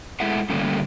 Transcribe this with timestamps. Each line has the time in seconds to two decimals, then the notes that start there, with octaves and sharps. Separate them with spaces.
0.20 G#3 A3 E4 E5 F#5
0.50 D3 F#3 G3 A3 A#3 C#4